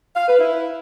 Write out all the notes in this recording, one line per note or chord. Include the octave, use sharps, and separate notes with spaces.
F5
B4
E4